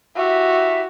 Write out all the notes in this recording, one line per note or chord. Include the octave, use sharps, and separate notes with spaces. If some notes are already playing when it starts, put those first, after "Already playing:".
E4 F#4 G4 E5